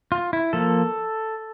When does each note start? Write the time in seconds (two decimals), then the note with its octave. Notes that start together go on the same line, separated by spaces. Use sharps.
0.12 F4
0.33 E4
0.53 F3 A#3 A4